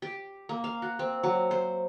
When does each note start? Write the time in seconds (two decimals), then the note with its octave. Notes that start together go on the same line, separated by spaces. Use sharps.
0.02 G4
0.49 A#3
0.64 F5
0.82 F#4
0.99 C4
1.23 F#3
1.51 C5